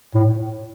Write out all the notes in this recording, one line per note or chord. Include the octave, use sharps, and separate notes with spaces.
A2